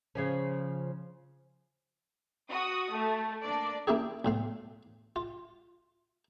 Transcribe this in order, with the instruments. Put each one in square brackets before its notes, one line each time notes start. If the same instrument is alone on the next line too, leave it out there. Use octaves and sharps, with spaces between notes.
[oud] C#3 F3 C#4
[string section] F#4 D#6
A3
A#3 D4 D5
[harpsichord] A#3 C#4 E4 G4 G#4
B1 A2 F5
F4